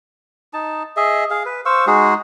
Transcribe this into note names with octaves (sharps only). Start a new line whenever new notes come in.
D#4 A5
G#4 D#5 E5
G#4 F5
B4
C5 F5 C#6 E6
G#3 D#4 F#4 G#4